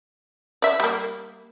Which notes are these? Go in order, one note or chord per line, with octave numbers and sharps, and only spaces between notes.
D5 E5
G3 A#3